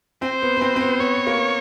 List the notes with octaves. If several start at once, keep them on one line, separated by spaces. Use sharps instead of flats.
C4 C5
B3
B3
C4
C4
B3
B3 C#5
A#3